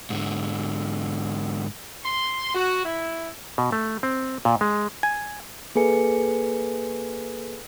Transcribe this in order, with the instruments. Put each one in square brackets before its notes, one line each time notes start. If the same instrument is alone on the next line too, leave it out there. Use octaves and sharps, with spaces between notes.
[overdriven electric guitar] G#2 D3
[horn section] C6
F#4
E4
[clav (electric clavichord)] B2
A3
C4
A#2
G#3
G#5
[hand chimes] A#3 G#4 A4 B4 G#5 C#7